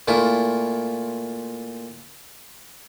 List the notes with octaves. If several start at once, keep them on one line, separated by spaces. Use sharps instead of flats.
A#2 A3 E4 F4